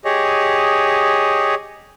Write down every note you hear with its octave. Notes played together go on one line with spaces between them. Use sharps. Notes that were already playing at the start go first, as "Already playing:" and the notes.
G4 G#4 C#5 D#5